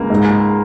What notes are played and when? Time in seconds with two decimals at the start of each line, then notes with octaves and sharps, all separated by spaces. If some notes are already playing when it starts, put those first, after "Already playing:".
Already playing: C#2 A#3
0.10 G#2